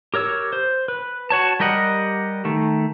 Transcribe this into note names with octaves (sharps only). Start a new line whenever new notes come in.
G4 A#4 C#5 E6
C5
B4
F#4 C#5 A5
G3 G4 A#4 D#5 F#5
D#3 A3